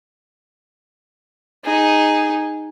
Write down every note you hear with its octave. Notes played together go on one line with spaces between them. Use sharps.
D#4 G#4